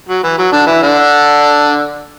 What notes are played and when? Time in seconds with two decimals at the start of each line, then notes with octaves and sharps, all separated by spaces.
0.09 F#3
0.24 E3
0.38 F#3
0.53 D3 D4
0.66 E3 E4
0.82 D3 D4